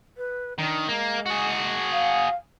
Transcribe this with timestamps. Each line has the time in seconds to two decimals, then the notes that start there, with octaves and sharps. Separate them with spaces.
0.17 B4
0.58 D#3 D4
0.88 G#3 A#3
1.26 F#4 G#4
1.92 F5